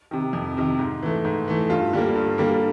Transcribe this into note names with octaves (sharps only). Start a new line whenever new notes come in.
C3 D#3
F2
C3 D#3
G#2
E3 A3
G#2
E3 A3
G2 F4
D3 G3 A#3
G2
D3 G3 A#3